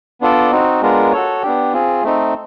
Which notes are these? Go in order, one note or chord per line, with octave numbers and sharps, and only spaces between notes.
B3 D4 F4 A4 D5
C4 D#4 F#4
G#3 B3 D4 F4 A#4
F#4 A4 C#5
B3 D4 G4
C4 F4 G#4
A3 C4 D#4